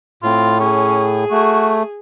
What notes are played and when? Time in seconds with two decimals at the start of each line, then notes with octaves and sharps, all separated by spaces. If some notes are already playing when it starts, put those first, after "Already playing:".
0.23 A2 C4 F4
0.60 C#4 G#4
1.31 A3 F#4